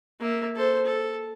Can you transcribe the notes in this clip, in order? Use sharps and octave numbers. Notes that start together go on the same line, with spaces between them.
A#3 E5
A4 C5
A4